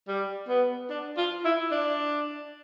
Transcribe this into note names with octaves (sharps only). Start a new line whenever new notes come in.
G3
B3
D4
F4
E4
D4